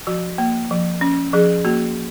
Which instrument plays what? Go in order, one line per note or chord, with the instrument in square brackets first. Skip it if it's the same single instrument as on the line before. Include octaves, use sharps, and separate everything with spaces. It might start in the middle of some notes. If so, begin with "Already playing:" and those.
[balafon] F3 F#4
A#3
F3
C#4
F3 G#4
A#3 F#4